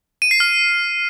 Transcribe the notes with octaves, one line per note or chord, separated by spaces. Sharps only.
D#7
C7
F6